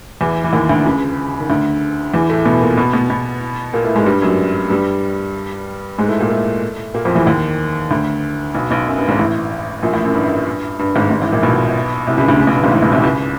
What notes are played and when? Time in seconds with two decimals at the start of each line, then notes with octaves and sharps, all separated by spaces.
0.21 E2 E3
0.44 E3
0.53 D#2 D#3
0.69 D2 D3
0.85 C#2 C#3
1.41 D#3
1.50 D2 D3
2.14 E2 E3
2.30 A2 A3
2.45 B2 B3
2.61 A#2 A#3
2.77 B2 B3
2.93 B2 B3
3.10 B2 B3
3.73 A#2 A#3
3.84 A2 A3
3.95 G#2 G#3
4.06 G2 G3
4.22 F#2 F#3
4.70 G2 G3
5.98 G#2 G#3
6.09 A2 A3
6.19 A#2 A#3
6.30 A2 A3
6.94 A#2 A#3
7.05 F2 F3
7.15 E2 E3
7.26 D#2 D#3
7.90 D2 D3
8.54 B1 B2
8.70 B1 B2
8.87 F#2
8.97 G2
9.08 G#1 G#2
9.19 A1 A2
9.83 A#1 A#2
9.93 A1 A2
10.05 F#2
10.15 G2
10.79 G2
10.95 G#1 G#2
11.11 G#1 G#2
11.22 A1 A2
11.32 A#1 A#2
11.43 B1 B2
12.07 C2 C3
12.17 C#2 C#3
12.28 D2 D3
12.39 C#2 C#3
12.47 B1 B2
12.56 G2
12.64 G#1 G#2
12.71 A1 A2
12.82 B1 B2
12.92 C2 C3
13.03 C#2 C#3